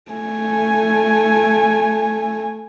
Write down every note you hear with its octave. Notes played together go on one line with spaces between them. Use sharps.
A3 G#5